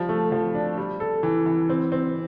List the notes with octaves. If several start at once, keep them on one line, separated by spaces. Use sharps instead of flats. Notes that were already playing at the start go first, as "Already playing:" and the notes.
Already playing: F3 G3
A3
F3
D4
G3
A4
E3
E3
C4
C4